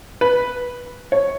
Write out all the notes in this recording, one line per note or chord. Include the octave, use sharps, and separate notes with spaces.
B4
C#5